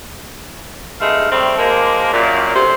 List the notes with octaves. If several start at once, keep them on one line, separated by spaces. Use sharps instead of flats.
G2 G#3 A3 F5
G3 A3 C4
F3 G#3 A#3
F#2 A#2
D2 C3 C5